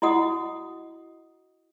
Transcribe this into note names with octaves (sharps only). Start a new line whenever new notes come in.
E4 F#4 D#5 F#5 D#6